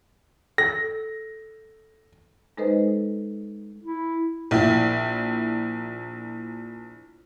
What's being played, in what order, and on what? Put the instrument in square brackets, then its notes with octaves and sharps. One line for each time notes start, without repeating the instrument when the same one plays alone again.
[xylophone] A4 [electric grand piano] A#6
[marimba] G#3 D#4 A4 B4 C5 D#5
[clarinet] E4
[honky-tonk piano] A#1 E4